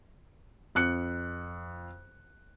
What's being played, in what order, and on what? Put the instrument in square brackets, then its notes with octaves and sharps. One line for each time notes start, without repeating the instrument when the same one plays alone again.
[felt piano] F2 F#6 C#7